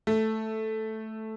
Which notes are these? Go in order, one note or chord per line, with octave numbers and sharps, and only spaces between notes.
A3